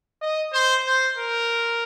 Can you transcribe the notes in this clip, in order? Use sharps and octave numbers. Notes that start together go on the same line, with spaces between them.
D#5
C5
C5
A#4